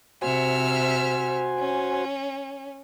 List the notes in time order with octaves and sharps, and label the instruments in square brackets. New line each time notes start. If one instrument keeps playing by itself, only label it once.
[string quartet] C3 E5 F6 [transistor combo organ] F#4 C5 G#5
[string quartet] C#4